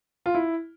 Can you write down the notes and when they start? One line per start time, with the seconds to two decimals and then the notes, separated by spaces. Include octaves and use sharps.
0.26 F4
0.34 E4